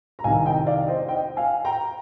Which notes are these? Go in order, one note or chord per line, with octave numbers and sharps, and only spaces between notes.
A#5
C2 C3 D#3 F5 G#5
D#5 G5
D5 F5
C5 D#5
D#5 G5
F5 G#5
G5 A#5